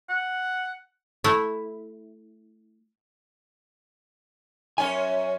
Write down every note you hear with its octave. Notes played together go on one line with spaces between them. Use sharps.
F#5
A3 E4
F#2 C#4 C#5 G#5